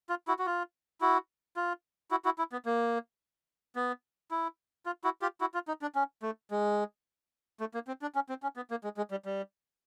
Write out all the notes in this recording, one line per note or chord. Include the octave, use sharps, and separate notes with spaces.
F4
E4 F#4
F#4
F4
E4 F#4
F4
E4 F#4
E4 F#4
E4
B3
A#3
B3
E4
F4
E4 F#4
F4 G4
E4 F#4
F4
D#4
D4
C#4
A3
G#3
A3
A#3
C4
D4
C#4
C4
C#4
B3
A#3
G#3
G#3
G3
G3